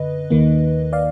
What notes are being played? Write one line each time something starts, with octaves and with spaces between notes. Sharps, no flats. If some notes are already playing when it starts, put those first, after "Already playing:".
Already playing: F#2 D3 B4 D#5
D#2 D#3 A#3
D5 F5